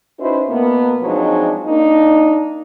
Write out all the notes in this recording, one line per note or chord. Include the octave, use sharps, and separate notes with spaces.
C#4 D#4 E4 F#4 B4 C5
B2 A#3 B3
F3 F#3 G#3 C4 D4 D#4
A#3 D4 D#4